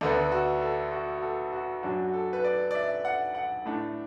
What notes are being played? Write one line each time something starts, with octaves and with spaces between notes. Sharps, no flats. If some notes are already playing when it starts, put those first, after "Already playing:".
D2 D3 B3 A4
F#4
A4
F#4
F#4
A4
F#4
F#2 F#3 D4 F#4
F#4
A4
B4
D5
D5
E5
F#5
F#5
A2 A3 D4